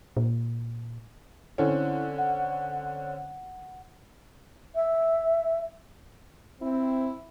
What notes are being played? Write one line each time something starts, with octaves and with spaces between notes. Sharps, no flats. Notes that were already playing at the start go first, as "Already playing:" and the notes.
A#2
D3 C4 C#4 E4
F#5
E5
C4 E4